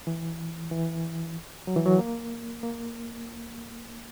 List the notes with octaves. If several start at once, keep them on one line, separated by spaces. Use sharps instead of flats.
E3
E3
F#3
E3
F#3
A#3
A#3